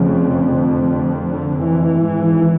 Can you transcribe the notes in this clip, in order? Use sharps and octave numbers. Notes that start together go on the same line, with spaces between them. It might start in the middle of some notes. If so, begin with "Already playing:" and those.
Already playing: F1 F2 C#3
D3
D3
D3
E3
G#1 G#2